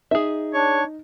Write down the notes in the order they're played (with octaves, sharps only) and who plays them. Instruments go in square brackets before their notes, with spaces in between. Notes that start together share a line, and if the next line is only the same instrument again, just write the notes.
[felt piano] D#4 [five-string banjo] G#4 E5
[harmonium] D4 [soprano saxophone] C#5